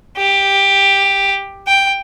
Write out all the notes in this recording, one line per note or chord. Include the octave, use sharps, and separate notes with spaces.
G4
G5